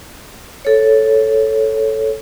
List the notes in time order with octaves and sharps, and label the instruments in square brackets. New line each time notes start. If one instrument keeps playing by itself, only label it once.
[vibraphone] A4 C#5